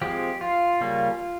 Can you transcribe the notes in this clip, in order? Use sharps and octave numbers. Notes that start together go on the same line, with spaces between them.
F3 G#3 C4 G4
F4
C#3 G3 A#3 C#4